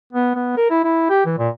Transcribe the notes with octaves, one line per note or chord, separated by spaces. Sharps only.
B3
B3
A#4
E4
E4
G4
E3
A#2